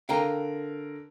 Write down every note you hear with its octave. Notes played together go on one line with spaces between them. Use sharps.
D3 A#4 F5 G5 A#5